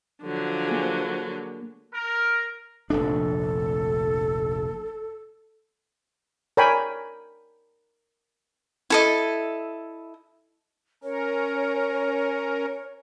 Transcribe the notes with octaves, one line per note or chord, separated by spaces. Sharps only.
D3 F3 F#3
A#3 G#4
A#4
F1 A#1 D4 A4
A#4 C#5 D5 G5 G#5 B5
E4 A4 D#5
C#4 A#4 C#5